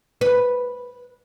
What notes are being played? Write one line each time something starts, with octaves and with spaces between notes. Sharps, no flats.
B4